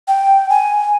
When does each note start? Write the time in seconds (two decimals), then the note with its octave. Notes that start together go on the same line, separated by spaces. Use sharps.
0.08 G5
0.50 G#5